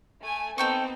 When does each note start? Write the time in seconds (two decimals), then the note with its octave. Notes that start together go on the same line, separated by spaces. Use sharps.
0.22 A3 G#5
0.58 B3 C4 D#4 A4 G5 C#6